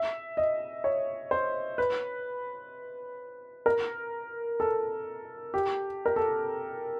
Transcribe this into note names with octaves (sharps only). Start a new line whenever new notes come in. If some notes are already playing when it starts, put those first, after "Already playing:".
Already playing: E5
D#5
C#5
C5
B4
A#4
A4
G4
A#4
A4